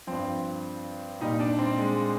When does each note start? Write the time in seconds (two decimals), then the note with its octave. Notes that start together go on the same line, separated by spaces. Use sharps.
0.07 G2 F3 C4
1.20 A#2 G3 D#4
1.40 D4
1.59 C4
1.78 G#3